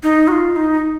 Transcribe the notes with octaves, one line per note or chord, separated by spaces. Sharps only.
D#4
F#4
F4
F4
D#4